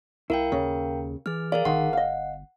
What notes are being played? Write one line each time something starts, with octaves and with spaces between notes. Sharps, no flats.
C2 E4 A#4 F5 G5
D#2 C#3
E3 G#4 F6
G#4 A#4 D5 F5
G1 D#3 F#5 C6
D#5 F5